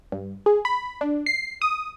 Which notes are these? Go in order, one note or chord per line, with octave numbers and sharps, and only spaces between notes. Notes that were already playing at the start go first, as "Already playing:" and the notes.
G2
G#4
B5
D4
C7
D#6